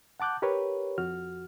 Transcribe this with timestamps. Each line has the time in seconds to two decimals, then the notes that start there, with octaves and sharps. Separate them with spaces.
0.20 F#5 A5 D6 F#6 G6
0.42 G4 A#4 B4 C#5
0.98 F2 F#4 F6